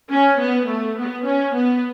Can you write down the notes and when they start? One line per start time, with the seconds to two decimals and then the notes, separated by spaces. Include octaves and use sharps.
0.11 C#4
0.40 B3
0.68 A3
0.98 B3
1.27 C#4
1.55 B3